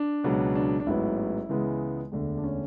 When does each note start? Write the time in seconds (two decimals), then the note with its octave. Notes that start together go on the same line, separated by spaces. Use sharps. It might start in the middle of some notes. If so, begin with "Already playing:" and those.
Already playing: D4
0.24 C#2 B2 F#3
0.55 D4
0.80 D4
0.86 A1 G#2 F#3 B3 E4
1.49 C#2 C#3 E3 G#3 B3
2.12 E1 D2 D3
2.37 D4
2.44 C#4